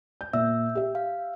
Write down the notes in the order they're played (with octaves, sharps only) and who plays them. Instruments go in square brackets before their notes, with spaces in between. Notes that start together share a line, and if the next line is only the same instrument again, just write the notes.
[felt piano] G6
[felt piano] A#2 [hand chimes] E5 E6
[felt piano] G4 E5
[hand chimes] F5